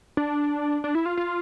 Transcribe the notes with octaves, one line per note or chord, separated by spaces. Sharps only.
D4
D4
E4
F4
F4